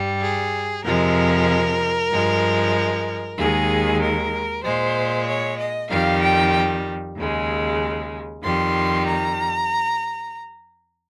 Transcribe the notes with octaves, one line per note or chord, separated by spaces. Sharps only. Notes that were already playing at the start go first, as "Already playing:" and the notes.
Already playing: G2 G3
G#4
F2 C3 F3 G#3 A#4
G2 F3 G#3
D#2 D#3 G#3 G#4
A#4
A#2 G#3 C5
C#5
D#5
F2 D#3 G3 F5
G5
D#2 C#3 G#3
F2 D#3 G3 C6
A#5